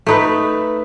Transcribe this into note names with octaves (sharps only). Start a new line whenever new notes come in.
A3 D#4 B4